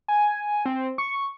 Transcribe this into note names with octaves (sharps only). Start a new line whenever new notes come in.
G#5
C4
C#6